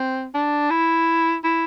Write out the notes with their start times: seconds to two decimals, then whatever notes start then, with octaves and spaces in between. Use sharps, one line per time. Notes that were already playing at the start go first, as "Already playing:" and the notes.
Already playing: C4
0.34 D4
0.70 E4
1.44 E4